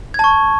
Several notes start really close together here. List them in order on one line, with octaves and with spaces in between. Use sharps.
G#6 A5 C#6